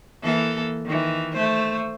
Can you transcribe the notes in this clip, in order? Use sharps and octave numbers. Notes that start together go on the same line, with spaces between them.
E3 A#3 A4
D#3 E3
A3 C5